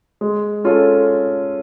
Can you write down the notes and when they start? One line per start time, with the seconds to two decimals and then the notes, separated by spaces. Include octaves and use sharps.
0.21 G#3
0.64 C#4 F4 A4